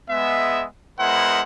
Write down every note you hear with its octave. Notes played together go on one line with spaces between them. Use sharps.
G#3 B3 E5
G#3 B3 E4 A#4 C5 F#5